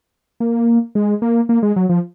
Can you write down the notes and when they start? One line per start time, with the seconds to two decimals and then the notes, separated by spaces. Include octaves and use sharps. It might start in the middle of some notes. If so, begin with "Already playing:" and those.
0.40 A#3
0.95 G#3
1.22 A#3
1.49 A#3
1.63 G#3
1.76 F#3
1.89 F3